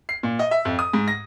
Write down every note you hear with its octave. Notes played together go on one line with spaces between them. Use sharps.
C7
A#2
D#5
E5
F2
D#6
G#2
A#6